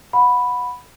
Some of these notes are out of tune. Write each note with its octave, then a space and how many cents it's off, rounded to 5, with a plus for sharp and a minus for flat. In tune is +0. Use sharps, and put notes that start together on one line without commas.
F#5 -30 B5 +0